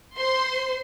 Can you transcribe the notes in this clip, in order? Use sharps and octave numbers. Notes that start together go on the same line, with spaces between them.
C5 C6